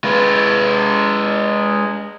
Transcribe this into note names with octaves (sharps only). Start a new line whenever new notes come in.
G#3 B4